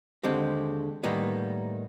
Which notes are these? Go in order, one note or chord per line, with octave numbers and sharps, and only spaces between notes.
D#2 D3 G#3 C4 G4
A2 D#3 G3 A#3 B3 D#4